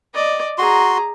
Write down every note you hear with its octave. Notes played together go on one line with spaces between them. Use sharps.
D5 D#5
F#4 G#4 A#5 C6